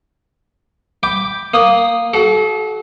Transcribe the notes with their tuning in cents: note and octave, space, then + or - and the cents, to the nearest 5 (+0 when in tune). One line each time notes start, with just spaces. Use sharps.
G5 +5 B5 +0 D6 +0
A#3 +0 D#6 -10
F#4 +25 A4 -35